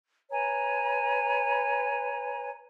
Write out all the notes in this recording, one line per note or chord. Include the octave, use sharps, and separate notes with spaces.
B4 C#5 G#5 A#5